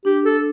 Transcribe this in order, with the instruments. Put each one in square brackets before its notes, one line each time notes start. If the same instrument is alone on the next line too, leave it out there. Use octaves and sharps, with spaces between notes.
[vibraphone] D4 [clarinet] G4
[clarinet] A4